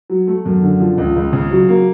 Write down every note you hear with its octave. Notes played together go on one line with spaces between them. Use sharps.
F#3
A3
F#2
D3
F3
C#2
C#2
C#3
F#3
A#3